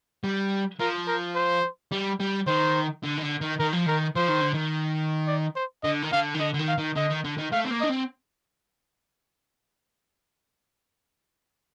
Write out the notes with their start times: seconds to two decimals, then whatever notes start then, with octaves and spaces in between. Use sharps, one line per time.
0.24 G3
0.80 F3 A#4
1.07 A#4
1.35 C5
1.92 G3
2.20 G3
2.47 D#3 C5
3.04 D3
3.18 D#3
3.23 D3
3.41 D#3
3.59 D#3 A#4
3.73 F3
3.86 D#3 A#4
4.16 F3 C5
4.28 D#3
4.41 D3
4.53 D#3
5.27 D5
5.56 C5
5.83 D3 D#5
6.02 D#3
6.12 D3 F5
6.34 D#3
6.40 D3 D#5
6.54 D3
6.59 D#3
6.68 F5
6.78 D#3
6.96 D3 D#5
7.10 D#3
7.25 D3
7.38 D#3
7.52 A3 F5
7.65 C4
7.71 A#3
7.81 D4 D#5
7.89 C4